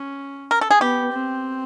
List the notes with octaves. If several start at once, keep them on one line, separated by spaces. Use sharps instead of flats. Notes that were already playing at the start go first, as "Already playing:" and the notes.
Already playing: C#4
A#4
A4
G#4
B3 G4
C4